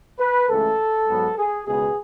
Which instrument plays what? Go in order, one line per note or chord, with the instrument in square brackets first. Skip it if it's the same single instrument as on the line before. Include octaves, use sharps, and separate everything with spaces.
[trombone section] B4
C#2 C#3 E3 A3 A4
G#2 F#3 B3
G#4
C#2 B2 G#3 B3 G#4